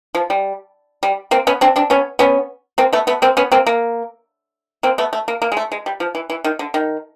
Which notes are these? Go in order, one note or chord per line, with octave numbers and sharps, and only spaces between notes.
F3
G3
G3
A#3 C4
B3 C#4
C4 D4
C4 D4
B3 C#4
B3 C#4
A#3 C4
A3 B3
A3 B3
A#3 C4
B3 C#4
A#3 C4
A#3
A#3 C4
A3 B3
A3
A#3
A#3
G#3
A3
G#3
G3
F3
E3
E3
D#3
D3
D#3